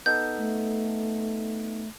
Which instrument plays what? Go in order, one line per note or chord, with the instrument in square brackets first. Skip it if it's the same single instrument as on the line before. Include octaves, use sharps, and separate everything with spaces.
[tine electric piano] B3 D#4 A4 [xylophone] G6
[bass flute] A3